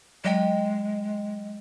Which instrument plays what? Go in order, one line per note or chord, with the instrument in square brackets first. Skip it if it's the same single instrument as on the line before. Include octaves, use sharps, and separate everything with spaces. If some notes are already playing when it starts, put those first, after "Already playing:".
[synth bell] F#3 D#5 G5 [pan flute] G#3